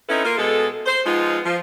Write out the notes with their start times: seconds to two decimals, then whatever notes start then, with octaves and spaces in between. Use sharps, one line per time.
0.09 C4 C#4 D#4 E4 A4 B4
0.25 A#3 F4 A#4
0.38 B2 G#3 A4
0.86 C5
1.05 F3 G#3 B3 D#4 F4
1.45 F3